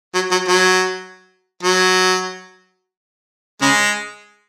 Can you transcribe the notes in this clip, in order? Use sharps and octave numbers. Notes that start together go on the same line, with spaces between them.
F#3
F#3
F#3
F#3
C#3 G#3